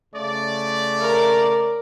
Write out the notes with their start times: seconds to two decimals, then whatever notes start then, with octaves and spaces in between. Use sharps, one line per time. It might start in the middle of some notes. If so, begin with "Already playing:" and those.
0.14 C#3 A3 D5
1.00 A#4